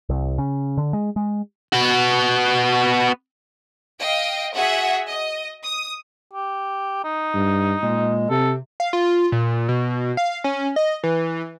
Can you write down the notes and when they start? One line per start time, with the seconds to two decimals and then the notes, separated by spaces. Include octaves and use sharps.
0.09 C2
0.38 C#3
0.78 D3
0.93 G#3
1.16 G#3
1.73 B3 F#4
4.01 D#5 F5 G5
4.54 F#4 G#4 E5 F#5
5.08 D#5
5.64 D#6
6.33 G4
7.04 D#4
7.34 G2
7.83 A#2 G#3
8.30 C3 C4 A4
8.80 F5
8.93 F4
9.32 A#2
9.68 B2
10.17 F5
10.44 C#4
10.76 D#5
11.03 E3